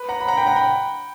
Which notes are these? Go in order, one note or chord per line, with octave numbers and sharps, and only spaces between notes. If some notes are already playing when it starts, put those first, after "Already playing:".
Already playing: B4
F#5 A#5
B5
F#5 A#5
G5 B5
F#5 A#5
G5 B5